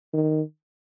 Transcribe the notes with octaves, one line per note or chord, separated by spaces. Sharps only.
D#3